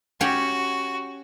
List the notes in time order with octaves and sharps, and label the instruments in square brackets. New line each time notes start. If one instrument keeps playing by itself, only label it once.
[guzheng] C#4 G4 F#5 [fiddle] F#4